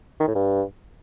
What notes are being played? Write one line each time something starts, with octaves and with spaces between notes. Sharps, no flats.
D#3
A2
G2